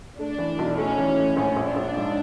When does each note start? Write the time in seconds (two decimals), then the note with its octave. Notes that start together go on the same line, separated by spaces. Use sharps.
0.19 A3 D4
0.38 E3
0.59 B1
0.78 A3 C#4
0.98 E3
1.17 A2
1.36 A#1 C#4
1.56 A#1
1.66 D4
1.76 A#1
1.96 G#2